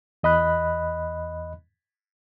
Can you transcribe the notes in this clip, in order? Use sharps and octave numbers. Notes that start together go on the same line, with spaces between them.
E2 D#5 B5 F#6